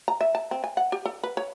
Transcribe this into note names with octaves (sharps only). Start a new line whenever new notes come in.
A#5
E5
A5
C4
G#5
F#5
G4
A4
B4
C#5